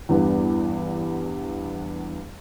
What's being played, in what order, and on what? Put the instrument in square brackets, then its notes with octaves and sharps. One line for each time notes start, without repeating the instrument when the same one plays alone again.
[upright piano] E2 G2 B3